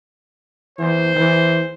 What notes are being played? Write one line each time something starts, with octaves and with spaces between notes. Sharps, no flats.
E3 C5
E3